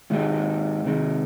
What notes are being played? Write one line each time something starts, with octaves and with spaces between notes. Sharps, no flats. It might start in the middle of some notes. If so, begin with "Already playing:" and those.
G#2 D#3 G#3 D#4 G4
C3 D#3 G#3